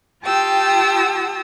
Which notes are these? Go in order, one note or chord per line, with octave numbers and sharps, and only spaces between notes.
F4 G4 G5 A5 D#6 E6